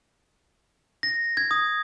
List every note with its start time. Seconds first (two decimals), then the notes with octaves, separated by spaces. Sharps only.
1.03 A#6
1.37 G#6
1.51 D#6